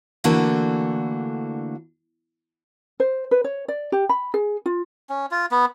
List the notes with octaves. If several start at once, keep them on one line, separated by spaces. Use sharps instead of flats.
D3 E3 A3 A#3 D4 F#4
C5
B4
C#5
D5
G4
B5
G#4
F4
C#4
F4
B3